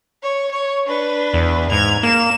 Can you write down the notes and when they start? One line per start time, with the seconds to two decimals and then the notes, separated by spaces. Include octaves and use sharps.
0.23 C#5
0.51 C#5
0.87 D4 B4
1.33 E2
1.71 G#2 G#6 F7
2.03 A#3 E7